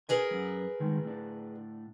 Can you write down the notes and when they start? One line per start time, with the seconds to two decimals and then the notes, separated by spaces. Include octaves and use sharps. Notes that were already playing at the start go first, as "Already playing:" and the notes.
0.09 G#4 A#4 B4 G#5
0.31 F#2
0.80 G2 D#3 G#3
1.03 A2 D4